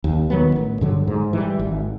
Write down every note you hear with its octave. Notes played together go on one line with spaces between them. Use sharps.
D#2
D#3 F#3 B3
A1
G2 D3 F#3
G#2
E3 G3
G#1